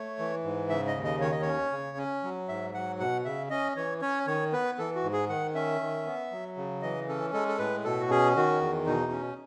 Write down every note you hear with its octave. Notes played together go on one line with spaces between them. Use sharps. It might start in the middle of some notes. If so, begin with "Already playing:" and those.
Already playing: A3 C#5
E3
G#2
C#3 E5
D#5
D#2
D#5
D#3 C#5
D#5
C#4 C#5
C#3
C#4
F#3
G#2 E5
F#3 F#5
B2 F#5
C#3 E5
C#4 D#5
E3 C#5
C#4 C#5
D#3 C#5
B3 B4
E3 A4
F#4
G#2
G#4
D#3 F#5
C#4 E5
D#3
B3
F#3
C#3
E3 D#5
C#4 A4
G#3 A4
A4
A2 B4
B2 A4
F#4
C#4 G#4
D#3 F#4
E2
B2 D#4
C#4